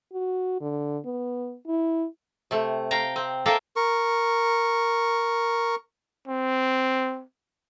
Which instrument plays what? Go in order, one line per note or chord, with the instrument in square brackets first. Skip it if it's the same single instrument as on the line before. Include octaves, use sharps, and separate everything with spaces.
[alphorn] F#4
D3
B3
E4
[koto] C3 A3
F5 G5 A#5
C4
A#3 A4 A#4 E5 F5 G5
[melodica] A#4 C#6
[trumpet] C4